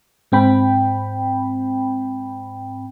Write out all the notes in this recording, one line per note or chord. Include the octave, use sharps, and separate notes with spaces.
G#2 C4 G5 B5